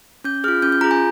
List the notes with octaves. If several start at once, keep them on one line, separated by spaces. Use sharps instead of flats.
C#4 G6
F4 G#4 F6
C#4 G6
G6
F4 G#4 A#5
G#5